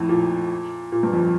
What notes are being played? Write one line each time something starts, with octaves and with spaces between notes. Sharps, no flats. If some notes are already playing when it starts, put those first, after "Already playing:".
Already playing: F2 A2
A#2
A#2
G2
F2